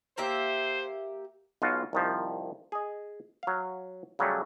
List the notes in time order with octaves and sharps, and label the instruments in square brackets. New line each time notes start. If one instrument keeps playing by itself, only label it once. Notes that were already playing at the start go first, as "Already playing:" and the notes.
[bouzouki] A#3 G4 E5 [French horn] C5
[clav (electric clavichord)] B1 B2 F4 F#4
C2 D#3 F3
G#4 D#5
F#3 F5
C#3 F#3 G3 A3